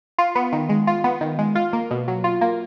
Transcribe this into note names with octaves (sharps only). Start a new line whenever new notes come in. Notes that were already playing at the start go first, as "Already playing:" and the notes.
F4
B3
D#3
G#3
F4
B3
D#3
G#3
F4
A#3
B2
F#3
F4
A#3